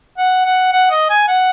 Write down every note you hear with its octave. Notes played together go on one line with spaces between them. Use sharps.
F#5
F#5
F#5
D#5
G#5
F#5